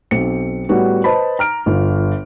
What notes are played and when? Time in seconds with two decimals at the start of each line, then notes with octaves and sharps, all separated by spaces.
0.11 B1 C4 C#7
0.69 A2 G3 B3 F#4
1.04 B4 C5 D#5 A5 B5
1.39 A#5 F6 D7
1.66 G1 F4